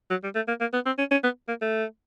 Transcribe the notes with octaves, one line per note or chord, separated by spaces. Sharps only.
F#3
G3
A3
A#3
A#3
B3
C4
C#4
C#4
B3
A#3
A3